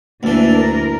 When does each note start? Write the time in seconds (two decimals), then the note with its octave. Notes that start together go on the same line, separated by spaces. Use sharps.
0.23 D2 E3 A#3 D4 E5
0.58 A#4